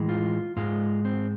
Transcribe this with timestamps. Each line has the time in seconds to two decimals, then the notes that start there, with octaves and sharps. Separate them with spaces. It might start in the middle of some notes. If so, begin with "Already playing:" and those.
Already playing: A2 E3 G#3
0.09 F4
0.57 G#2 G#3 F4
1.05 C4